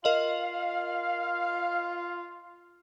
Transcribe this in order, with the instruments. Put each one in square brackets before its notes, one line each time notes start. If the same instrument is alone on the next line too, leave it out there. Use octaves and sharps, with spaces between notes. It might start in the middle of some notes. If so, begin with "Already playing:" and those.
[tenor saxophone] F4 [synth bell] A#4 D#5 F#7 [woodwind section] F5